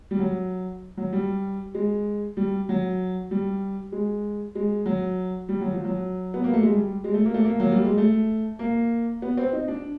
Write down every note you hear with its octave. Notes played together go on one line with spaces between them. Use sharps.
G3
F#3
F#3
G3
G#3
G3
F#3
G3
G#3
G#3
F#3
G3
F#3
F3
F#3
B3
A#3
A3
G#3
G3
G#3
A3
A#3
A3
A#3
F#3
G3
G#3
A3
A#3
B3
C4
D#4
D4